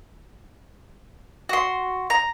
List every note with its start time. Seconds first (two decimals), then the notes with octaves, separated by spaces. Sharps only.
1.49 F#4 C6
2.10 A#5